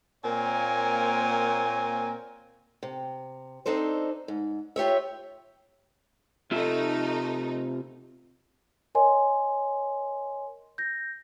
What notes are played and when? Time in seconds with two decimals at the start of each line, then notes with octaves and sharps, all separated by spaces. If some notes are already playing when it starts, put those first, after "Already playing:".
0.24 A#2 A#3 C4 A#4 C#5 G#5
2.83 C3
3.66 C4 D4 D#4 A4 C5
4.28 G#2
4.76 F4 G4 C#5 E5
6.51 C3 A3 D#4 F4 E5
8.95 A#4 C#5 D#5 G#5 C6
10.78 G6 A#6